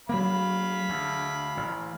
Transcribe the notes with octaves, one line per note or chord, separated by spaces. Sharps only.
F#3 A3 A#3 F5 B5
D2
A1